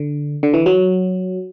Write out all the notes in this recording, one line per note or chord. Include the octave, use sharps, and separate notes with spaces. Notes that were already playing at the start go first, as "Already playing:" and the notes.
Already playing: D3
D3
E3
F#3